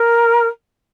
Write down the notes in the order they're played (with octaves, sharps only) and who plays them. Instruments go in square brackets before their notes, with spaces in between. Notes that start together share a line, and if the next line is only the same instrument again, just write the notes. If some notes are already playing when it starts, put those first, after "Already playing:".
Already playing: [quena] A#4